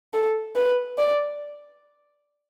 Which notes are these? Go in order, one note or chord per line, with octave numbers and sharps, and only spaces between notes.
A4
B4
D5